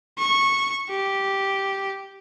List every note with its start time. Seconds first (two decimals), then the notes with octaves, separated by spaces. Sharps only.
0.18 C#6
0.90 G4